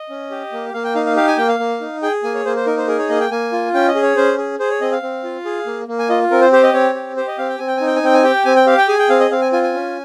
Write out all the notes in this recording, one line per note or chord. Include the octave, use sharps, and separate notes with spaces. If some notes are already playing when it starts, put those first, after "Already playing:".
Already playing: D#5
C#4
G4
A#3
A#3 F5
G5
D#4 F5
F5
G4 F5
G#5
A#3 G5
F5
A#3
D#4
G#4 G5
A#3 G#5
C#5
A#3 C5
C5
D#4 A#4
C5
G#4 A#4
C#5
A#3 D#5
G5
A#3 G#5
F4
C#4 G5
D#5
G#4
C#5
C#4 C5
G#4
G#4 C5
C#5
C4 D#5
F5
C4
F4
G#4
A#3
A#3
G#5
F4 D#5
C4 A#4
C5
G4 C5
D#5
C4 C#5
G4
G4 C5
D#5
C4 F5
G5
C4 G#5
G5
D#4 G#5
G5
G#5
C4 G5
G#5
G4 G5
C4 G#5
G5
G4 F5
G5
G#4 G#5
G5
C4 F5
D#5
C4 F5
G#5
F4 G#5
G#5
C#4